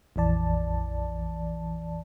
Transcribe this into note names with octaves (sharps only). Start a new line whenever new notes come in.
A#1 F2 E3 D5 A5